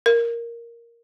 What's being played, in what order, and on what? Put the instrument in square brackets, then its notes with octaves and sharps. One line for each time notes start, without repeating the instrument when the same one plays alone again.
[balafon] A#4